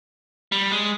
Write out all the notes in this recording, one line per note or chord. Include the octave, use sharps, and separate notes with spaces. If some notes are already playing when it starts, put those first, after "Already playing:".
G3
G#3